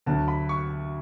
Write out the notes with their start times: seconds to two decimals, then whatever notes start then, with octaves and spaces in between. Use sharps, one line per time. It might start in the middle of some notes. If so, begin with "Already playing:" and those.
0.06 D2 D3 F#3 A5
0.28 B5
0.49 C#6